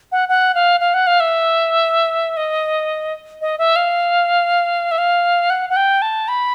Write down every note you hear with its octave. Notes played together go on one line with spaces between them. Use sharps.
F#5
F#5
F5
F5
F#5
F5
E5
D#5
D#5
E5
F5
E5
F5
F#5
F#5
G5
A5
B5